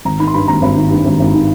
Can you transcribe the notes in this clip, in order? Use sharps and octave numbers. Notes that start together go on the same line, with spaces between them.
G#1 A#5
D#3 B5
C6
G2 B5
G#1 A#5
G#1 B5
D#3
G2
G#1
G#1
D#3